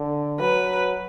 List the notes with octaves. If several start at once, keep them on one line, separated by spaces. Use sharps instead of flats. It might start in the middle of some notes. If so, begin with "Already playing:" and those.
Already playing: D3
F#3 B4